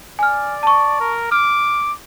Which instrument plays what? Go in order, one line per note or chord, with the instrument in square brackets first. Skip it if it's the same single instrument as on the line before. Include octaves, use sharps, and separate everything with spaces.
[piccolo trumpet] D5 [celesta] G#5 F6
[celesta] A5 C#6
[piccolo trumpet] A#4
[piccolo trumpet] D6 [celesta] F6